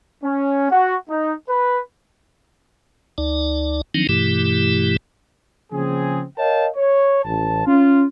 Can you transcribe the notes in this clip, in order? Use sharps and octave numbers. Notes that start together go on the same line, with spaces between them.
C#4
F#4
D#4
B4
D2 D#4 D5
D#3 F3 F#3 C4 D4 D#4
G2 B2 E3 A3 E4 G4
C#3 F3 A#3 C4 G#4
A#4 C#5 D#5 F5 G5 A5
C#5
A1 A5
C#4 F4